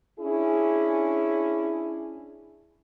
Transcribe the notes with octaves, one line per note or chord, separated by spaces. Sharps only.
C#4 D4 E4 G#4